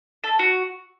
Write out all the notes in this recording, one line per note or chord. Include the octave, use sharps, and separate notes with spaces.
A4
F#4